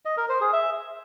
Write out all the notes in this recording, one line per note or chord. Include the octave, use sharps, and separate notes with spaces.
D#5
A#4
C5
G#4
E5